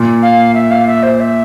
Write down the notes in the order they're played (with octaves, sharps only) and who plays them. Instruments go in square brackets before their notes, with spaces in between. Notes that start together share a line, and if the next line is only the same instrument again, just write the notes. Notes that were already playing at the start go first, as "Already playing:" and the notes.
Already playing: [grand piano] A#2
[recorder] F5
E5
F5
E5
C5
E5